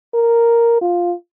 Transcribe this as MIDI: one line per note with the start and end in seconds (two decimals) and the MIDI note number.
0.14 0.80 70
0.81 1.14 65